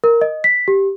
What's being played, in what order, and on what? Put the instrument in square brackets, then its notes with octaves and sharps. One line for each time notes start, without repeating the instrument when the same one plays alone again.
[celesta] A#4
D#5
B6
G4